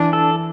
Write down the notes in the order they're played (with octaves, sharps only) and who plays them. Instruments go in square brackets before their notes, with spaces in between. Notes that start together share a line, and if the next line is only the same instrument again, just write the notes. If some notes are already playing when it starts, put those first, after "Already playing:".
Already playing: [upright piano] E3 [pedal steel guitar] D4
[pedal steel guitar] A4